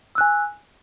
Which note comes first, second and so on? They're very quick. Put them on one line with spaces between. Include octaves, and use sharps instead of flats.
E6 F#6 G#5